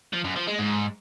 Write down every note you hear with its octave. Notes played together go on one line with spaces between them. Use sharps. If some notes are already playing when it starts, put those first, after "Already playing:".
F3
F#2
F3
G#3
G#2